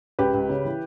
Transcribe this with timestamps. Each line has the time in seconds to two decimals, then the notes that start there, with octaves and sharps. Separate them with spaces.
0.19 C#2 G4 B4
0.34 C#2
0.49 C#3
0.65 E3